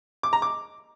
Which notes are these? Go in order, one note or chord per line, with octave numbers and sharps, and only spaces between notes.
D6
A#5
D6